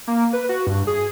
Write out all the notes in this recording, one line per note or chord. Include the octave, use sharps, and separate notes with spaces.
A#3
B4
F#4
G2
G#4